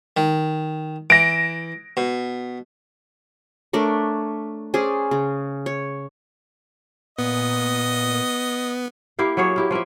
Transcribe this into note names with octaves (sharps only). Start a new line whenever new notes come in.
D#3
E3 A#6 D7
B2
A3 D4 A#4 C#5
C#4 G#4 C5 D5
C#3
C#5
A#2 B3 D#5
A#3 E4 G4 F5
F#3 A#3 G#4 C#5
A#3 E4 G4
F3 A#3 E4 E5